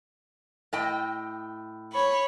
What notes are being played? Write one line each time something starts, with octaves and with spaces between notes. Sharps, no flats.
A2 D#5 G5
C#5 B5